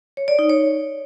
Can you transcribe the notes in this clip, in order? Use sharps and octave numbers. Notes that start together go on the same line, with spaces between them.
C#5
D5
D#4
C#5